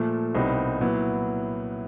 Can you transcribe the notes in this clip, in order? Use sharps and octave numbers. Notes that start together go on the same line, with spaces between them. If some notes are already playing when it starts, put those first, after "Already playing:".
Already playing: A#2 F3 A3
C2 B2 G3 C4 D#4
A#2 F#3 B3 E4